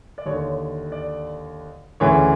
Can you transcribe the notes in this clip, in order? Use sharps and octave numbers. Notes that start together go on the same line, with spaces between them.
D5
D#2 D3 C#5
C#5
D5
D2 C#3 E3 C#5